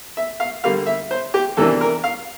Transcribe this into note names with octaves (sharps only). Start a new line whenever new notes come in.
E5
F5
D3 G3 A#3 F5
E5
C5
G4
E2 C3 E3 A#3 D4 A4
A#4
F5